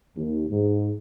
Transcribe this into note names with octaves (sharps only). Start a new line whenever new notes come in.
D#2
G#2